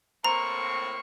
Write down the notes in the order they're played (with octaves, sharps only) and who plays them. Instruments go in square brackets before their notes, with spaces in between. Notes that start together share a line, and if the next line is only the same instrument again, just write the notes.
[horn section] A2 A#3 C4 [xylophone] A#5 [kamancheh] C#6